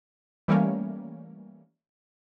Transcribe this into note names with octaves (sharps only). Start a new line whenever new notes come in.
E3 G3 A3 A#3 C#4